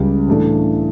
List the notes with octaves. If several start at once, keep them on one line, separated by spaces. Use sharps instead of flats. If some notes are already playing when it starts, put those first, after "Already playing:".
Already playing: C#2 C#3 G3
A2 E3 A3 D4